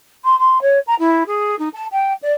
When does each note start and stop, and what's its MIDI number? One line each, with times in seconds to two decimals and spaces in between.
0.24 0.38 84
0.39 0.61 84
0.61 0.79 73
0.87 0.95 82
0.99 1.23 64
1.27 1.58 68
1.59 1.69 63
1.73 1.86 81
1.92 2.13 79
2.22 2.32 74